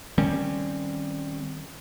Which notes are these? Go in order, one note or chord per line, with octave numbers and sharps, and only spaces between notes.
D#3 G3 C4 C#4